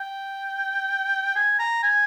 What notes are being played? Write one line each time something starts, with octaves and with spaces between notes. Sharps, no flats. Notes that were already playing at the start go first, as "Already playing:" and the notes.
Already playing: G5
G#5
A#5
G#5